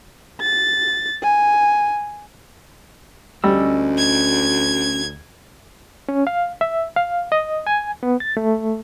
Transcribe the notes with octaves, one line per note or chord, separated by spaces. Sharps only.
A6
G#5
D2 G3 C#4 D#5 E6
G#6
C#4
F5
E5
F5
D#5
G#5
B3
A6
A3